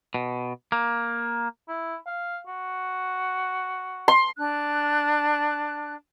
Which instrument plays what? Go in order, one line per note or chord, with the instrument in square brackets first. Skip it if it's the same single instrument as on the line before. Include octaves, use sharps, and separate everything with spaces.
[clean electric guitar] B2
A#3
[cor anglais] E4
F5
F#4
[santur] C6
[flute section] D4 F#6